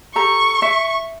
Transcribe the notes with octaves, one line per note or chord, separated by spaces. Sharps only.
G4 A4 A#5 C#6
E5